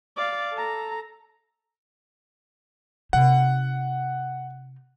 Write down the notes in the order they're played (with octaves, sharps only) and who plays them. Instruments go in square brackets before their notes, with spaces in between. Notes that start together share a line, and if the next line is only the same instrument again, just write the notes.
[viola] D5 F5
A4 A#5
[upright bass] C3 D#4 [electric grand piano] F#5